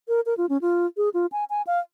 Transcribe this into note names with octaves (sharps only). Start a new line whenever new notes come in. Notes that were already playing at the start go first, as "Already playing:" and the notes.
A#4
A#4
F4
C#4
F4
G#4
F4
G#5
G#5
F5